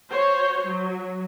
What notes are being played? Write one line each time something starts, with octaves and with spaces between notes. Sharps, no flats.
F#4 C5 C#5
F#3